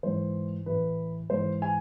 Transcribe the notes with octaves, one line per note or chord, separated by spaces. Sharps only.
G#2 E3 C5
A2 E3 B4
G#2 E3 C5
G#5